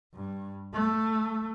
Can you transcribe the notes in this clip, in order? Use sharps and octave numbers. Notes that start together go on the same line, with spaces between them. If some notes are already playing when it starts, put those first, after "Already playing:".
G2
A3